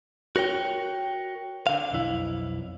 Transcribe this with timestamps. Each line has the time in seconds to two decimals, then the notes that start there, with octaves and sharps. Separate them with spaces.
0.36 F#4 A#4 C#5 G5
1.67 D3 F5
1.92 B1 F2 E4